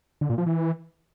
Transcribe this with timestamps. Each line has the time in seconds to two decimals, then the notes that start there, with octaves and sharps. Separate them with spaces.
0.21 D3
0.30 A#2
0.38 F3
0.46 E3